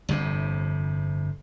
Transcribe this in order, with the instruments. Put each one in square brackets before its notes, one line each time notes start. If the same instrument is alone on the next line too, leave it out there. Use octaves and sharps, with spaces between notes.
[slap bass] G1 F2 C3